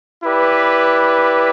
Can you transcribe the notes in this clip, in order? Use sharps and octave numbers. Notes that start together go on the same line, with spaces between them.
E4 G4 B4 D5